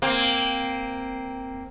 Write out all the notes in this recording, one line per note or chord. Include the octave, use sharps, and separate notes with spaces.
A#3 C4